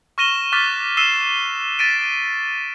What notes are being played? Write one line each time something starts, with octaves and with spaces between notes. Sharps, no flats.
C#6 F6 A#6 D#7 E7 G7
C#6 D6 F6 F#6 A6 B6
E6 C7 D#7 E7 G7
A6 B6 D7 D#7